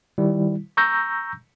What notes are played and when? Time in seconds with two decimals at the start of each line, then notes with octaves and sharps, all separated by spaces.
0.18 D#3 G3 E4
0.77 A#5 C#6 E6 G6 A#6